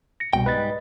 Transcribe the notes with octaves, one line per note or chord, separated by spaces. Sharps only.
A#6 C#7
C2 B2 G3 G5
G#2 G3 B4 D#5 A6